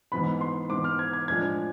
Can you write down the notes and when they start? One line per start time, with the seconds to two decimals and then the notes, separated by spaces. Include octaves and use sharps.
0.12 G#2 E3 B3 B5
0.41 C6
0.69 G#2 E3 B3 D6
0.84 F6
0.99 G#6
1.13 G#6
1.28 A2 F3 G#3 D4 G#6